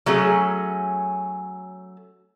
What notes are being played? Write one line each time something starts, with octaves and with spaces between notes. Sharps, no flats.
F#3 A3 C#4 G#4